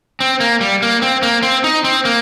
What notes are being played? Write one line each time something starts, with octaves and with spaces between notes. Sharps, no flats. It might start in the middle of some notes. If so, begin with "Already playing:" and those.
C4
A#3
G3
A#3
C4
A#3
C4
D#4
C4
A#3